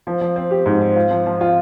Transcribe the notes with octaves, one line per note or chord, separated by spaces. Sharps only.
F3
F3
C4
G4
G#2
C4
F4
F3
F3
F4